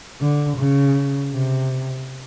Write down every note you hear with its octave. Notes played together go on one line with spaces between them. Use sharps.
D3
C#3
C3